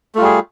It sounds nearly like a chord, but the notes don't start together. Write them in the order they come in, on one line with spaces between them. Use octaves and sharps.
A3 F4 G3 G#4